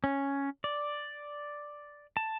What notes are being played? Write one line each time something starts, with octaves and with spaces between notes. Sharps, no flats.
C#4
D5
A5